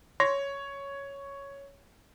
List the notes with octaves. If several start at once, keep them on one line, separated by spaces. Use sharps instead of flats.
C#5 C6 A#6